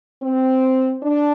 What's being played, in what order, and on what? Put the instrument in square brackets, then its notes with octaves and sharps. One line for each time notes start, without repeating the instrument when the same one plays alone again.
[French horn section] C4
D4